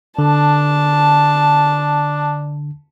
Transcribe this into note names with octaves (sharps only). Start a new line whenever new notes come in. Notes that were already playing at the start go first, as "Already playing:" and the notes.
D3 D4 A5